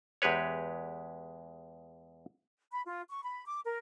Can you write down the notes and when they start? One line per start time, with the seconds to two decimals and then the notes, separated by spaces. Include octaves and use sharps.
0.22 E2 G#3 G4 B4 C#5
2.72 B5
2.86 F4
3.10 C#6
3.23 B5
3.46 D6
3.65 A#4